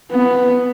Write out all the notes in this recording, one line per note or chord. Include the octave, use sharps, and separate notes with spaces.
B3